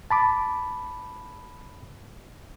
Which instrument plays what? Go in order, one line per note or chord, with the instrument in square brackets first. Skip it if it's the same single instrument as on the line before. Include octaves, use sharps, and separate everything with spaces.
[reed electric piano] A5 B5 D6